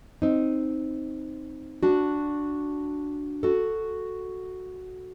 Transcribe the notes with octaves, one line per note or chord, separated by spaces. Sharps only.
C4 D#4
D4 F#4
F#4 A4